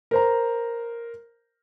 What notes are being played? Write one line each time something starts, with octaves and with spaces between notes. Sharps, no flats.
A#4 C5 A#5